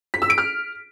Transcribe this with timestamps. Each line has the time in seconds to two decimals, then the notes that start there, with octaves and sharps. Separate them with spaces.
0.14 B6
0.22 E6
0.30 D7
0.38 F6